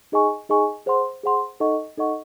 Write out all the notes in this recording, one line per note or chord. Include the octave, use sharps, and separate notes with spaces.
D#4 G#4 D#5 G#5 C#6
D#4 G#4 D#5 G#5 C#6
G#4 C5 F#5 C6
G#4 C5 F#5 C6
D#4 A4 D#5 F#5 C#6
D#4 A4 D#5 F#5 C#6